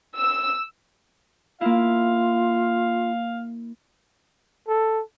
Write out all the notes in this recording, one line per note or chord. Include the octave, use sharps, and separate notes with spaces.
E6
A#3 E4 F4 F5
A4